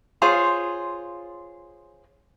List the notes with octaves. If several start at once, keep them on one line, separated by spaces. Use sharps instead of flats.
F4 G#4 C5 C#5